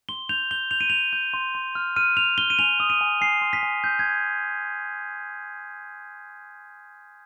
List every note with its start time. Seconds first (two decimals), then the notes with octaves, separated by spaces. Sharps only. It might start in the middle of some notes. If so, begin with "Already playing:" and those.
0.09 C6 G7
0.29 G6 F7
0.51 G6 G7
0.71 G6 F7
0.81 D#7
0.90 G6 F7
1.13 G6
1.34 C6
1.55 C6
1.75 F6
1.96 F6 D#7
2.17 F6 F7
2.38 F6 G7
2.50 D#7
2.59 G#5 F7
2.80 D#6
2.90 D#7
3.01 G#5
3.21 G#5 C7
3.42 C6
3.53 B6
3.63 G#5
3.84 G#5 G6
3.99 G#6